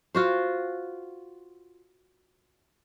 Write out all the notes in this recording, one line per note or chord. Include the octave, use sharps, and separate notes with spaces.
F4 F#4 C5